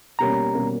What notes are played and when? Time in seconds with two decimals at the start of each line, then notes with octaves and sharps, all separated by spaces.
0.19 B2 G3 A#3 C#4 A#5
0.54 B2 G3 A#3 C#4